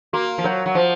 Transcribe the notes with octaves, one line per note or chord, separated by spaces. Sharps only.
A#3 F#4
F3
F#3 A#4 C#5
F#3
F3 C5